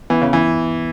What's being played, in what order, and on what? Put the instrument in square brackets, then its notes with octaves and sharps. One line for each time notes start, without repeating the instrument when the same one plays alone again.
[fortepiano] E3 [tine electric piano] B3
[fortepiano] C#3
E3